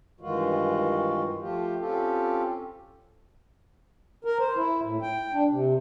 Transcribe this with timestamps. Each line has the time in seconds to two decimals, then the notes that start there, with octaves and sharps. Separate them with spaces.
0.21 G2 D#3 E3 G#3 F4 F#4
1.39 F3 A3 F4 G4
1.79 C4 C#4 F4 G4 A4
4.25 A#4
4.39 C5
4.56 E4
4.82 A2
5.02 G5
5.33 D4
5.50 C3